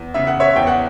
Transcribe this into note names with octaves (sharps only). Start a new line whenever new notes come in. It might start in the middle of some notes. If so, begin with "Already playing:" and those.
Already playing: E2
C#3 E5
F#5
C#5 E5
E2 G5
F#5